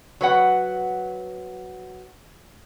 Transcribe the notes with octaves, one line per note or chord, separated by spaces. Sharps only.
F#3 B4 F#5